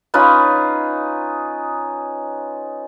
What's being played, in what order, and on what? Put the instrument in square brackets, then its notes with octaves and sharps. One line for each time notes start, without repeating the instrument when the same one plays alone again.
[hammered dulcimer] C#4 D#4 F4 B4